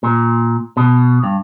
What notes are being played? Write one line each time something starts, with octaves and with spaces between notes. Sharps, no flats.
A#2
B2
G2